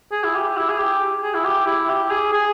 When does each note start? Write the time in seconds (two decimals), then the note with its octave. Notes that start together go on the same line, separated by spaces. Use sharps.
0.12 G#4
0.24 E4
0.35 G4
0.57 E4
0.69 G#4
0.78 G4
1.23 G#4
1.34 E4
1.45 G4
1.66 E4
1.89 G4
2.10 G#4
2.33 G#4